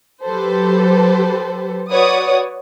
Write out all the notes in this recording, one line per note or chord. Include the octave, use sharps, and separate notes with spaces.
F#3 G4 A4 B4 C5
F#4 B4 C#5 D5 F#5 D#6